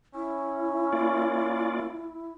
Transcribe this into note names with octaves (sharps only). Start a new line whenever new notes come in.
C#4 E4
A#3 F4 D5